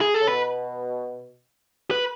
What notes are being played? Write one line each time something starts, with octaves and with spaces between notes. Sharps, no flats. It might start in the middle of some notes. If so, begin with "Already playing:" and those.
G#4
A4
C#3
B2 B4
B4